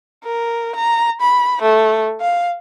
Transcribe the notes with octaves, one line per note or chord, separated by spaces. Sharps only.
A#4
A#5
B5
A3
F5